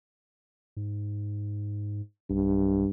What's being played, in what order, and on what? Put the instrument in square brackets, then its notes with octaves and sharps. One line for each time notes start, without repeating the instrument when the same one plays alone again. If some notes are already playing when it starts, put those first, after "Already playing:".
[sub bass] G#2
[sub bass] B1 [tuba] G2